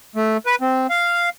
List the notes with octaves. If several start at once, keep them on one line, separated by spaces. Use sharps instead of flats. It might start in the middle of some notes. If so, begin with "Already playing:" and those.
A3
B4
C4
F5